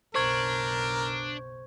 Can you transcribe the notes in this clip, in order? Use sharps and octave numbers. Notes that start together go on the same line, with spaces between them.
F#1 B1 D4 A#4 C5 C#6 G#6